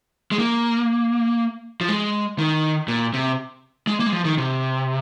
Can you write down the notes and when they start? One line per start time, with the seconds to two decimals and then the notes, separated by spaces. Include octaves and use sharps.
0.31 G#3
0.39 A#3
1.81 F3
1.89 G#3
2.39 D#3
2.88 A#2
3.14 C3
3.87 G#3
4.00 A#3
4.06 G#3
4.12 F3
4.25 D#3
4.38 C3